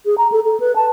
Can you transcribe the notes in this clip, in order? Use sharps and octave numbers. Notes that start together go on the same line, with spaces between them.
G#4
A#5
A4
A4
B4
A5